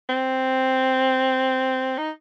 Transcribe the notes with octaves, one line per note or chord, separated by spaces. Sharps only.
C4
D#4